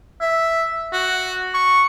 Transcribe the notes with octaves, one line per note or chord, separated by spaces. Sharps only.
E5
F#4
C#6